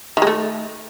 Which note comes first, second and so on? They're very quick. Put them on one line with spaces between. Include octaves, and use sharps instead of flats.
D#3 G#3 A3